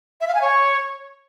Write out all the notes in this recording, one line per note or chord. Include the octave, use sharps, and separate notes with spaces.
E5
F5
G#5
C#5